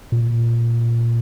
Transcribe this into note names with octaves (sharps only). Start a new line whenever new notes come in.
A#2